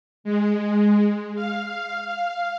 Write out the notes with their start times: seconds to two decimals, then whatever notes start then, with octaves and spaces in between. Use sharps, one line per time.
0.24 G#3
1.35 F5